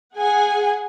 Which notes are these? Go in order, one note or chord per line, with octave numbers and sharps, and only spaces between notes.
G#4 F#5 G#5